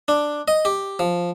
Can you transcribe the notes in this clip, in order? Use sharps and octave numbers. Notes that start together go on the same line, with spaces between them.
D4
D#5
G4
F3